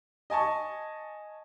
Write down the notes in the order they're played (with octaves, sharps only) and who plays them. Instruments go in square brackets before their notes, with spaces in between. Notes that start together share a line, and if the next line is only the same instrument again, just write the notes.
[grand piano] D#5 G#5 A5 C#6